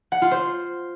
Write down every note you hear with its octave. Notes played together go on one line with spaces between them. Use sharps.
F#5
F4
C5